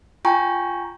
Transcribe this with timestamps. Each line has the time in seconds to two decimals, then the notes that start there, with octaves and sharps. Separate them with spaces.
0.25 F4 G5 G#5 A#5 C#6